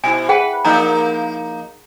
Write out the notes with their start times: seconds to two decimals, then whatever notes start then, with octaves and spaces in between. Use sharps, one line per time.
0.04 B2 E4 G#5
0.29 G#4 B4 F#5 G5
0.65 F3 A#3 D#4 A#5